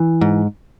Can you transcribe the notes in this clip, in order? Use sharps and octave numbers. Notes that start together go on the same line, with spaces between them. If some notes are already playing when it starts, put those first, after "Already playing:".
Already playing: E3
G#2